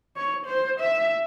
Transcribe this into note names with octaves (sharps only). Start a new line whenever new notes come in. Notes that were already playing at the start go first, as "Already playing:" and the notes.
C#5
C5
E5